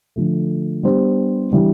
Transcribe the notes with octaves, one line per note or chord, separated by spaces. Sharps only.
D3 F3 A3
G3 B3 D4 G4 C5
E3 G3 D4